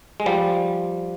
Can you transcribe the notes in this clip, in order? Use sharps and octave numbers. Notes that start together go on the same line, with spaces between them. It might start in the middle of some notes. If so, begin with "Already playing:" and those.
G#3
F3 G3